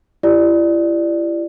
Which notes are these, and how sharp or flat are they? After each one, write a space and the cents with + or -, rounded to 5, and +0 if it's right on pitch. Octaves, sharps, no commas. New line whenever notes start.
E4 +35 G4 +0 D5 +10